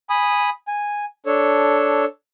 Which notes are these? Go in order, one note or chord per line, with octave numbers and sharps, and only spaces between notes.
G#5 B5 D#6
G#5
D4 A4 C#5